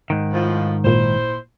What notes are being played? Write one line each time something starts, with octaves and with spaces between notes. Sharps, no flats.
G#2 D#3
A2 F3
G#1 A#2 E4 C5